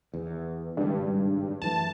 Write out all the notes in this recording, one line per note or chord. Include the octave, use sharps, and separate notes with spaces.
E2
G#1 G2 C#3
F#2 E3 A3 A5